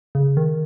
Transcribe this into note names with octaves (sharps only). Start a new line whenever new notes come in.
C#3
D#3